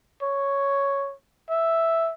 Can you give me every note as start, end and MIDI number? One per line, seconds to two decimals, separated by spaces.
0.22 1.14 73
1.49 2.13 76